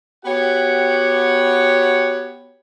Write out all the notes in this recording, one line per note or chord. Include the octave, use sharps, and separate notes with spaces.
B3 F#4 G4 C#5 F#5 G5